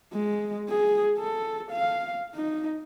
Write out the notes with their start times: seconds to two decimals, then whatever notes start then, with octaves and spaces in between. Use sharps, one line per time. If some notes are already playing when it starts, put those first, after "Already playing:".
0.13 G#3
0.69 G#4
1.19 A4
1.71 F5
2.35 D#4